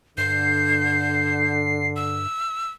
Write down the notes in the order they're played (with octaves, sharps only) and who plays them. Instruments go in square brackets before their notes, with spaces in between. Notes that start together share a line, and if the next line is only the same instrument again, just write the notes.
[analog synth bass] G2 [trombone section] D3 [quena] G6 [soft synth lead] C7
[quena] E6